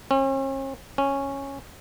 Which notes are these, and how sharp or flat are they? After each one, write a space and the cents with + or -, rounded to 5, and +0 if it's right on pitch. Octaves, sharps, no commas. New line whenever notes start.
C#4 -45
C#4 -10